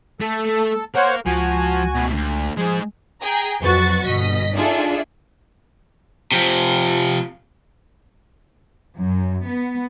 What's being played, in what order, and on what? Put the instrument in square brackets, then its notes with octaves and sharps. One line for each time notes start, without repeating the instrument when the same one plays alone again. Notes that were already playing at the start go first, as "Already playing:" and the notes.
[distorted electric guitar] A3 [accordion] A4
[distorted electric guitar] A#4 F5 [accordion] C5 C#5 F#5
[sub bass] C#2 [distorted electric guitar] F3 [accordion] F#4 G#5
[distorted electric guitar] B2 A3
D2
[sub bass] F3 [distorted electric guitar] G#3 C5 [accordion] G#4
[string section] G#4 G5 A#5
F2 F#3 F#4 B4 C#6 A6
G1 B2 D#5 B6
D4 D#4 F4 G#4 A4 E5
[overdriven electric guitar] C3 F3
[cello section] F#2
B3